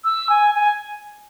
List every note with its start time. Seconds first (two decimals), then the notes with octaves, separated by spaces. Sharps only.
0.04 E6
0.30 G#5
0.55 G#5